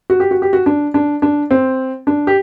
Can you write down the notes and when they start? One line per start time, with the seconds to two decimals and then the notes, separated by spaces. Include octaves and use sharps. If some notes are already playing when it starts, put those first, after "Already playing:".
0.10 F#4
0.20 G4
0.31 F#4
0.42 G4
0.53 F#4
0.66 D4
0.94 D4
1.22 D4
1.51 C4
2.07 D4
2.27 G4